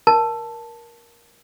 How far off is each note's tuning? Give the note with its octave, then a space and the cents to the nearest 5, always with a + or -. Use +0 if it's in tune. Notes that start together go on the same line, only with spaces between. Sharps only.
A#4 +15 A5 +0